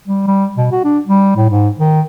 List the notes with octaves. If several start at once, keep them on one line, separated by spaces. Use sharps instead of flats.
G3
G3
B2
F#4
D4
G3
A2
G#2
D#3